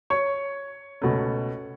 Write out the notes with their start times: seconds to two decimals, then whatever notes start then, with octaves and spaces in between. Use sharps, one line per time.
0.10 C#5 C#6
1.01 C#2 B2 A3 C#4